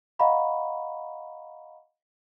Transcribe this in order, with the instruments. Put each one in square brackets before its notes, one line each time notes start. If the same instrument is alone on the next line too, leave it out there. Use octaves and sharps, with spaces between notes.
[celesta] D#5 F5 F#5 A#5 B5 C#6